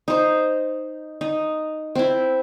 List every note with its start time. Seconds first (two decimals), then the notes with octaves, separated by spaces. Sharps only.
0.08 D#4 C5
1.21 D#4
1.95 C4 E4